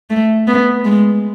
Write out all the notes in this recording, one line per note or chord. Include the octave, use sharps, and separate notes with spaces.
A3
B3
G#3